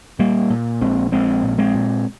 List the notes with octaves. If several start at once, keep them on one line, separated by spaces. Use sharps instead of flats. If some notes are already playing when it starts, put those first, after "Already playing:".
A#2 G3 A#3
A#2
A#1 G#3 C4
A#1 G#3 C4
A#2
G#3 C4
A#2